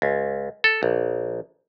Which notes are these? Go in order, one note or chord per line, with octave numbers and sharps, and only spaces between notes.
C#2
A4
A#1